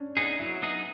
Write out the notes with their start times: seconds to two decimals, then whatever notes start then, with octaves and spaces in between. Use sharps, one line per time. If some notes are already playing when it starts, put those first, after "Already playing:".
Already playing: C#4 D4
0.17 B3 D4 D#4 G#4
0.39 F#3 E4
0.62 B3 D#4 G#4